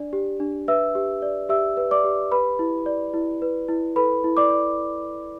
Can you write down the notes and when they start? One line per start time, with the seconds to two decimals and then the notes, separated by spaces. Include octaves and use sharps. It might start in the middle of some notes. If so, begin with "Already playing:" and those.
Already playing: D4 D5
0.13 G4
0.40 D4
0.68 B4 E5 E6
0.95 G4
1.22 D5
1.49 G4 E5 E6
1.77 B4
1.91 D5 D6
2.04 G4
2.32 B4 B5
2.59 E4
2.86 D5
3.14 E4
3.42 B4
3.68 E4
3.96 A4 B4 B5
4.24 E4
4.37 D5 D6
4.50 D5